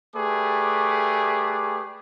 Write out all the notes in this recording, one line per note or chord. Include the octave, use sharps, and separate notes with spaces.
A3 G4 G#4 B4 D5 D6